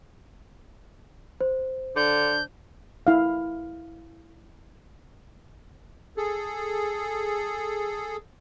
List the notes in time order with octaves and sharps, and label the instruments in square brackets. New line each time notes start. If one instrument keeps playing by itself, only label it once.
[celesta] C5
[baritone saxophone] D3 [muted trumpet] D4 [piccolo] G6
[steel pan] E4 F5
[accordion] G#4 A4